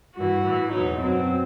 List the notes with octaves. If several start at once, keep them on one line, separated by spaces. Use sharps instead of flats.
G2 E3 F#4
A2 E3
E2 B2 F#3 D#4
F#2 F#3 C4